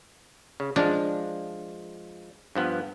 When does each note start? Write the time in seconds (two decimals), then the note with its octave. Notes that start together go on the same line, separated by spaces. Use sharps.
0.60 C#3
0.76 F3 G#3 D4 F5
2.55 G2 F3 B3